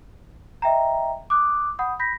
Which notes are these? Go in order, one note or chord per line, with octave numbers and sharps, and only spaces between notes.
D#5 E5 G5 A#5
D6 D#6 F#6
F#5 B5 D#6 G6
B5 G6 A#6 B6